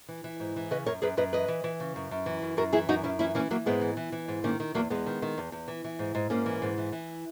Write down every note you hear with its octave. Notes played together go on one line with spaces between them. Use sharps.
E3
E3
G#2
E3
C#3 B4 D#5
F#2 A#4 C#5
F#2 G#4 B4
F#2 B4 D#5
E3 B4 D#5
E3
E3
C#3
F#2
F#2
E3
F#2
F#2 F#4 A#4
E3 E4 G#4
F#2 D#4 F#4
F#2 C#4 E4
E3 C#4 E4
E3 A#3 C#4
E3 F#3 A#3
G#2 G#3 B3
E3
E3
E3
G#2
D#3 A#3 C#4
D#3
E2 F#3 A#3
E2 G#3 B3
D#3
D#3
E2
E2
E3
E3
G#2
G#2
G#2 A#3 C#4
E3
G#2
E3
E3